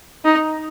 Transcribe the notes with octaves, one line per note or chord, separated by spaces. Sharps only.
D#4